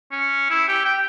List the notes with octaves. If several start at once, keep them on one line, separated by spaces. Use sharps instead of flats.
C#4
E4
G4
G5